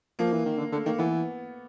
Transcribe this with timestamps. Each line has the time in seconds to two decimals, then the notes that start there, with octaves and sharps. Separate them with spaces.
0.19 F3 A#3
0.33 E3
0.46 D#3
0.59 D3
0.72 D3 A3
0.86 D#3 A#3
0.98 E3 B3